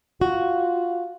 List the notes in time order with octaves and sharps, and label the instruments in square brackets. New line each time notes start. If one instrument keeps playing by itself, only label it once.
[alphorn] F4 [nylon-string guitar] F#4